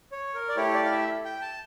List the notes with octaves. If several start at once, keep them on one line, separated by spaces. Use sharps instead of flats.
C#5
A#4
D5
A3 E4 G4 C#5
D5
F5
E5
G5
A5